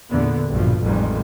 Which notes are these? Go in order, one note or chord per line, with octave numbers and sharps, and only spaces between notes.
E2 A#2 D3 B3
A#1 G2 B2 F3
A1 F2 D#3 G3 G#3